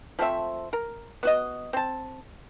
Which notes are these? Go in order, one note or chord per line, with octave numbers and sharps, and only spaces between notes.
F3 A3 C4 E5
A#4
B3 F#4 D#5
C4 A5